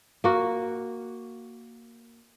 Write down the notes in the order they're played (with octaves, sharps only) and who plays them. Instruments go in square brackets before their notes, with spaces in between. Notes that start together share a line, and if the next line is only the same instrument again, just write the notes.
[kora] A#3 F#4